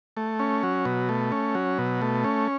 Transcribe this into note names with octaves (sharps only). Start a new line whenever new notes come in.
A3
C#4
F#3
B2
A3
C#4
F#3
B2
A3
C#4